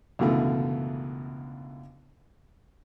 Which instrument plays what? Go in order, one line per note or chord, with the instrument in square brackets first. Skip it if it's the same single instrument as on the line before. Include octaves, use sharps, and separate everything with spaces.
[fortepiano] C#2 F#2 B2 D3 E3 A3